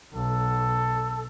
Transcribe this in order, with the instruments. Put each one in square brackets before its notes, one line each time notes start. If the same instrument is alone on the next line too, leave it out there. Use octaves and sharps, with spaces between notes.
[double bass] B1 [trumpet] A4